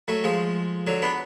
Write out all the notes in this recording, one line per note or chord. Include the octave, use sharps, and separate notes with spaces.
F#3 A3
F3 G#3
D3 F#3
B3 D4